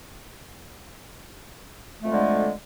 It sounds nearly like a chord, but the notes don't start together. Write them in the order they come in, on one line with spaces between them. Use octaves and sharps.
A3 F2 G#3 D3